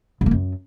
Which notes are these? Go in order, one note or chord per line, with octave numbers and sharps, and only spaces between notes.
G#2
A#3
F#2